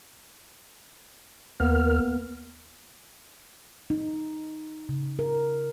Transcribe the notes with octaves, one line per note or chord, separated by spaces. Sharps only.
D#2 A#3 B3 A#4 F6
D#4
C#3
A#4